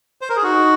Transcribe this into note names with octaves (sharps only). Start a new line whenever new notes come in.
C5
A#4
G#4
D#4 F#4